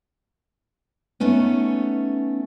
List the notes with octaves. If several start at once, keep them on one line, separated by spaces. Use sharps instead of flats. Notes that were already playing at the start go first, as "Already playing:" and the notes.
A3 B3 C#4 D#4